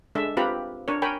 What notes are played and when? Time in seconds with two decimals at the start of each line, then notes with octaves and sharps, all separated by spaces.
0.15 G#3 D4 A4 E5
0.37 C4 F4 G4 B4 A#5 B5
0.88 D4 A#4 C#5
1.02 A#4 C#5 G5 G#5 B5